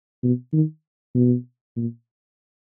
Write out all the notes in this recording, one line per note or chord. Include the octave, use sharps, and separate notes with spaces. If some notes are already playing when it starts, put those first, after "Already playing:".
B2
D#3
B2
A#2